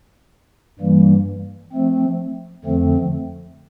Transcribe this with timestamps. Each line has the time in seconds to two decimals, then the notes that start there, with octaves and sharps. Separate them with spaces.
0.79 G2 E3 G3 A#3
1.72 F3 A3 C4
2.64 F2 D3 F3 A3 C4